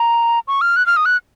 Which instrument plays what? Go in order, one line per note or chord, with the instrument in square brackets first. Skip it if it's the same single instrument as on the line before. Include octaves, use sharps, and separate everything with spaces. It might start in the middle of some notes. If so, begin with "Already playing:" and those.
Already playing: [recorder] A#5
C#6
F6
F#6
F6
D#6
F#6